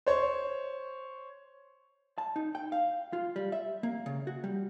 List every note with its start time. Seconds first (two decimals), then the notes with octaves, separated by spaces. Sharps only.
0.06 C5 C#5
2.18 A5
2.36 D#4
2.55 G5
2.72 F5
3.13 F4
3.36 G3
3.52 E5
3.83 A#3
4.06 C#3
4.27 F#4
4.44 G3